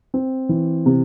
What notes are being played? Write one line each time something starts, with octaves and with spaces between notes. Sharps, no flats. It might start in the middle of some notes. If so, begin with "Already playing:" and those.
C4
E3
C3